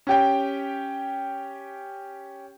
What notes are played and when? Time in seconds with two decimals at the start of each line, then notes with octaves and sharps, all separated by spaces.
0.07 C#4 G4 G5